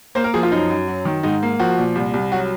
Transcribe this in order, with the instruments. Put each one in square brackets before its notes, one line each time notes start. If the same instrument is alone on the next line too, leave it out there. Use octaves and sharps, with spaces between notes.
[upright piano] A#3 C5
A#4
F3 G#4
F4
F#2 D#4
F#2
F#3
D#3
G#2 D#4
A#3
F3 F#4
A#2
C2
C2
F#3 F#4